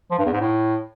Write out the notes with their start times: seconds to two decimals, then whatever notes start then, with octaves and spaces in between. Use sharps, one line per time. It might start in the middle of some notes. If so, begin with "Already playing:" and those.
0.11 F3
0.18 G2
0.26 E2
0.33 G#2
0.40 A2